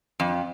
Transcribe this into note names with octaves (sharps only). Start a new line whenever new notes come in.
F2